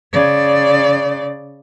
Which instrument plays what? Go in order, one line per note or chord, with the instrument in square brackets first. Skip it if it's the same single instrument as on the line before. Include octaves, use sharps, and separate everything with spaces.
[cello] C#3 D5